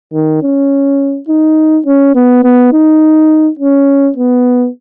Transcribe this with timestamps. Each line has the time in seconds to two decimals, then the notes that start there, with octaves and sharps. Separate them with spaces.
0.13 D#3
0.42 C#4
1.28 D#4
1.86 C#4
2.15 B3
2.44 B3
2.72 D#4
3.59 C#4
4.17 B3